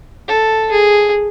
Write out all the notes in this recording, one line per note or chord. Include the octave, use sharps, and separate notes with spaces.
A4
G#4